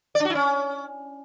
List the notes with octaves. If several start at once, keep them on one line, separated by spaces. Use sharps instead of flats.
D5
D4
F#4
E4
C#4